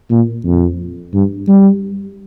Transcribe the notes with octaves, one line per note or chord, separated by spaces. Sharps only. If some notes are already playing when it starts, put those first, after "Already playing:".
A#2
F2
G2
G3